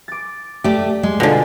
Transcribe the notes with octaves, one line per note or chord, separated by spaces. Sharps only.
D6 A6
A3 G4 D5
G#3
B2 D3 F4 G#5 A5